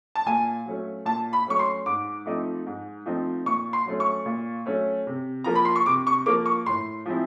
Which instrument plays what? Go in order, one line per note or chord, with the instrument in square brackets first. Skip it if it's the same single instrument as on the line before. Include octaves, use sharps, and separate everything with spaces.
[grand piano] A5
A#2 G#5
F#3 A3 C#4
A#2 A5
B5
F#3 A3 C#4 C#6
C6
G#2 D6
F3 A3 C4 D#4
G#2
F3 A3 C4 D#4
A#2 C#6
C6
F#3 A3 C#4
C#6
A#2
F#3 A3 C#4
C3
F3 A#3 A#5
B5
C6
C#6
C3 D6
C#6
F3 A#3 D6
C#6
A2 C6
F3 G#3 C4 E4